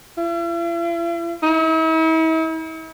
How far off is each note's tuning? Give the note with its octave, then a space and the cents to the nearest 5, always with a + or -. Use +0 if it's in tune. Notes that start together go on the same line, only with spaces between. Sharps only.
E4 +45
E4 -45